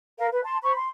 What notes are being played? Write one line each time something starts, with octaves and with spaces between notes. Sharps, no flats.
A#4 F5
B4
A5 C6
C5 B5 C#6
C6